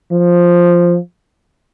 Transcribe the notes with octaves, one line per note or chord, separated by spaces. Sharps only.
F3